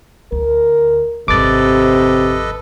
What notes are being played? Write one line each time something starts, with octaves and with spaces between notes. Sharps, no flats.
D2 A#4
G#1 F2 C3 A4 B4 D#5 D6 A6